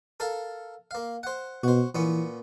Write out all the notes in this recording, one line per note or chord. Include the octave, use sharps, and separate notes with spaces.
A4 A#4 F5
A#3 F5
C5 F#5
B2 F#4 C5
A#2 E3 B3 C#4